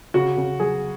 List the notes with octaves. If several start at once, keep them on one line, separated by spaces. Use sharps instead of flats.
C#3 F#4
C#3
F#3 G#4